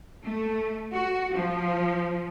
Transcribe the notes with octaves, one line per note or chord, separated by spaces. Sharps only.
A3
F#4
F3